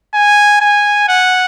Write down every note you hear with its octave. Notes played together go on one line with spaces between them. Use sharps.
G#5
G#5
F#5